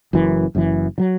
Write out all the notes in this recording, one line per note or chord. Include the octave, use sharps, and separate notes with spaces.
F#1 F#2 E3
F#1 F#2 E3
D3 F#3